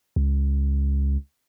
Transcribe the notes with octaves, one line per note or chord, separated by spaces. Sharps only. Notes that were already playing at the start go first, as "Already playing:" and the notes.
C#2